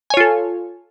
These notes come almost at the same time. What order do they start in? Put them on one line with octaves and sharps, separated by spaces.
G#5 C#5 F4 A4